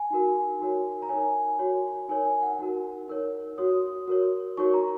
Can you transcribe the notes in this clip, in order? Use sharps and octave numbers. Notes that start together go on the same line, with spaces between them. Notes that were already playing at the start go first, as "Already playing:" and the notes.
Already playing: G#5
D#4 F#4 A#4
D#4 F#4 A#4 C#5
A#5
D#4 A#4 C#5 G#5
F#4 A#4 C#5
D#4 A#4 C#5 G#5
G#5
F#5
D#4 F#4 A#4
D#4 A#4 C#5
F#4 C#5 D#6
F#4 A#4 C#5
D#4 F#4 A#4 C#5 C#6
A#5